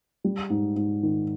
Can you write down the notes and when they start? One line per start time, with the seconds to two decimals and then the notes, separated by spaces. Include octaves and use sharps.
0.24 G3
0.50 G#2
0.76 G#2
1.03 D#3